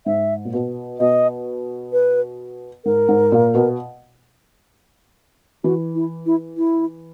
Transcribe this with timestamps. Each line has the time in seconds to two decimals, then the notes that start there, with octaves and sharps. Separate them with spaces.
0.06 G#2 E5
0.45 A#2
0.53 B2
1.00 B2 D#5
1.93 B4
2.85 G#2 A#4
3.08 G#2
3.32 A#2
3.55 B2
5.64 E3 F#4
5.95 E4
6.26 E4
6.57 E4